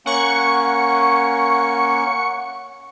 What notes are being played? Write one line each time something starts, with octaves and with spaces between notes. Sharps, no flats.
A#3 C#4 F#5 C#6 C#7